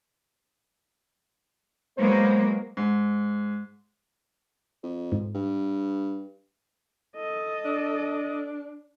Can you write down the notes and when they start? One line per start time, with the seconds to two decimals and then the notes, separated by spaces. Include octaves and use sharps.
1.97 F#3 G#3 A#3 B3 B4 C5
2.77 G#2
4.83 F2
5.12 G#2
5.35 G2
7.16 A4 D#5
7.65 D4